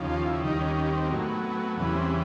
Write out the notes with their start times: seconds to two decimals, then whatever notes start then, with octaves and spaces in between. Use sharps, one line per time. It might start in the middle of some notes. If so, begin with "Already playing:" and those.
Already playing: D#2 C#3 F3
0.09 F4
0.26 E4
0.42 D#2 D#3 G3 D#4
0.59 C#4
0.76 C#4
0.93 C4
1.10 A2 F#3 A#3
1.26 B3
1.44 B3
1.60 B3
1.77 E2 C#3 E3 G3 B3
1.93 C4